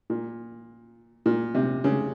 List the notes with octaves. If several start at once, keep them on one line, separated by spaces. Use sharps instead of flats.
A#2
A#2
C3
C#3